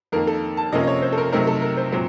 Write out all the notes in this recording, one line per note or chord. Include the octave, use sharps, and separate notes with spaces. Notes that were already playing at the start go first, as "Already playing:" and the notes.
F2 D#3 A#3 A#4
A4
A5
C3 F3 A#3 C#4 D#5
D#5
C#5
C5
A4
A#4
C3 F#3 A3 C4 D#4 A#4
A4
A#4
C5
A#2 F#3 C4